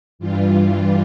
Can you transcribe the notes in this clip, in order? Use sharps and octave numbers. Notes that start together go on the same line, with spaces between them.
G2 E3 G3 F4